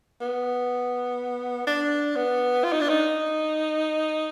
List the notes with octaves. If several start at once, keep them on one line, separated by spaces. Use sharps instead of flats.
B3
D4
B3
F4
D#4
D4
D#4